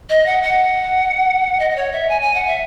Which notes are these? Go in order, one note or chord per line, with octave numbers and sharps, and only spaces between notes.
D#5
F#5
F#5
D#5
D#5
C#5
E5
G#5
G#5
F#5
E5